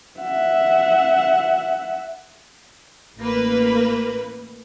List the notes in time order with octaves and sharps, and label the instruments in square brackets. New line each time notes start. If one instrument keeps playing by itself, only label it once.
[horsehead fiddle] E5 F#5
[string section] A1 A#3 B4